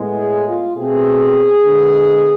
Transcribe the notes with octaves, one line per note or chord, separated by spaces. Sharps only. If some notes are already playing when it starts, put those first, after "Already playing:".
Already playing: A2 G#3 B3
G#4
F4
B2 A3 C4 G#4
D3 G#3 B3